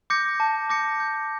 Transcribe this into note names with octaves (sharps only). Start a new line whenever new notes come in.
D6 G6 A#6 C#7
A5
D6 G6 A#6 C#7
G6